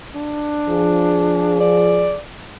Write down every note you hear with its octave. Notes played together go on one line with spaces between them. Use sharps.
D4
F3 G#4
D5